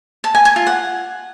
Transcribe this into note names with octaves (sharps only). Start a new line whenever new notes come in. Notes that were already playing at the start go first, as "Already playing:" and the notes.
A5
G#5
G#5
F4
F#5